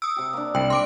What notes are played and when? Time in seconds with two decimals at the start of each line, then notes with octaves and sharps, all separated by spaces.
0.02 D#6 E6
0.16 C3 G4
0.33 A#3 D4
0.55 C2 G5
0.70 G3 C6 D6 D7